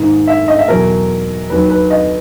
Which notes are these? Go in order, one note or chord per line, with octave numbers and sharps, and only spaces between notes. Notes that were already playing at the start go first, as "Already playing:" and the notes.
Already playing: G#2 D#3 A#3 D#4
E5
D#5
E5
E2 B2 F#3 A#4
D#2 D#3 F#3 B4
B4
D#5